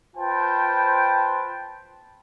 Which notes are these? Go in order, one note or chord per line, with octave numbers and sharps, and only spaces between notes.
F4 B4 C5 G5 A5